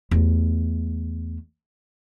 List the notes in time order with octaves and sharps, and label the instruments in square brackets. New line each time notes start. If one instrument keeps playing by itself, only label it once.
[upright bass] E2 A3